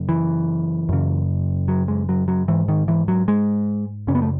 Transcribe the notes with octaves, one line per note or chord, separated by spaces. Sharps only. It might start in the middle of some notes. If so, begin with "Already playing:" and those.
Already playing: F#2 C#3
E3
F#2 C#3
F#3
G#3
F#3
F#3
G#2 E3
D#3
E3
F#3
G#3
F#2 C#3 C#4
B3
A3